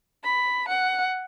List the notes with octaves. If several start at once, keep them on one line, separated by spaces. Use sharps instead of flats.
B5
F#5